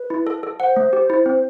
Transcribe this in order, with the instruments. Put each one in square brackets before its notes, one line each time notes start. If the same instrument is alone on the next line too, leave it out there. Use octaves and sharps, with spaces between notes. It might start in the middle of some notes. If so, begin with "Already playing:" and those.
Already playing: [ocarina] B4
[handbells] E4
A4
A4
[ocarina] C5 [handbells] F#5
[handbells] A3
G4
E4
C4